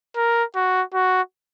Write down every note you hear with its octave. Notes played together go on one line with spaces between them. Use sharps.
A#4
F#4
F#4